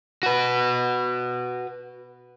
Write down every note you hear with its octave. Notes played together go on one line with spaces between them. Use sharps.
F#4 B4